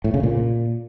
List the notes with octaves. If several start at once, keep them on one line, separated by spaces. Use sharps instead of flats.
A2
C#3
A#2